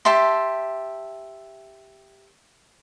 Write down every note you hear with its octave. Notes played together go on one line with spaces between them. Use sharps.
G4 E5 A5 C6